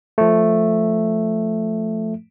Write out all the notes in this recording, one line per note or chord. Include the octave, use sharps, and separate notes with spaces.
F3 A3